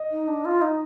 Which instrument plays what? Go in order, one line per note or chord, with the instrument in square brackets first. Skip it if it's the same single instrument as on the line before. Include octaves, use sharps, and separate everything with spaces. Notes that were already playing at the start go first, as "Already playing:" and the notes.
Already playing: [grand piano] D#5
[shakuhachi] D#4
D4
F4
D#4